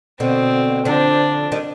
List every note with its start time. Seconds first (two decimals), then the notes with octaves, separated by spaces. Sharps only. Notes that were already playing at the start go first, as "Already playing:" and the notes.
0.20 B2 D3 C4
0.85 D3 F3 D4
1.52 D#3 G3